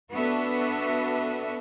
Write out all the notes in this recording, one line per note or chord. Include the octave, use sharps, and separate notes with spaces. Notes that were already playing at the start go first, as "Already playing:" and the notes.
B3 D4 F#4 A4 B4 E5